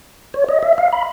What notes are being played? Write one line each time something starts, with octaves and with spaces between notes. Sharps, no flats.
C#5
D#5
E5
F5
B5